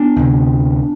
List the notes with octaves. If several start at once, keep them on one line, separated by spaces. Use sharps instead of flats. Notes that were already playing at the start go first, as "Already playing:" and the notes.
Already playing: B3 D4
D2 C3